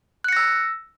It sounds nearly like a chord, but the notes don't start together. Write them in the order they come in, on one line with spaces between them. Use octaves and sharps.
F#6 C#7 A#6 E6